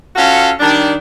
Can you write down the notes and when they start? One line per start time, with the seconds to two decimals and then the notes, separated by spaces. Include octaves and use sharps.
0.16 C#4 F4 F#4 A4 F5
0.60 D#3 G3 D4